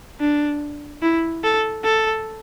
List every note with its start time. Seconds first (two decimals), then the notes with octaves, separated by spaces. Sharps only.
0.20 D4
1.03 E4
1.44 A4
1.84 A4